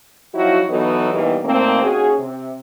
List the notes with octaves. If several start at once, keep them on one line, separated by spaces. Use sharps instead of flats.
F3 F#3 D#4 E4 F#4
E3 F#3 B3 D#4 F#4 A4
D#2 B2 D#3 E3 G3
A#2 D#3 A3 A#3 C4
D#2 C#4 F#4 G#4
C3